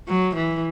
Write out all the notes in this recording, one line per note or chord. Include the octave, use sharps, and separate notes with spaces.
F#3
E3